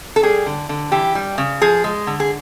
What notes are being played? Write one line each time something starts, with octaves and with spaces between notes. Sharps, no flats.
A4
G3 G#4
D3
D3
E3 G4
G3
C#3
F3 G#4
G#3
D3
G#4